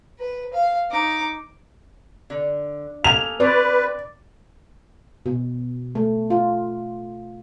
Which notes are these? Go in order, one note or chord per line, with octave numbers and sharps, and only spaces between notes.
B4
F5
D#4 D6
D3
A#3 A4 G#5 F7
C4 F#4 B4 D5
B2
A3
F4